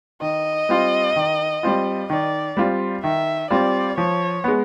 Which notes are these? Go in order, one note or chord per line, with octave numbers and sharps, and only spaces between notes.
D#3 D#5
G3 C4 F4
D#3
G3 C4 F4
D#3 D5
G3 C4 F4
D#3 E5
G3 C4 F4 D5
F3 C#5
G#3 B3